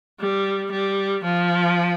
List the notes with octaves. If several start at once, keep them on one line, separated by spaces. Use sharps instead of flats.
G3
G3
F3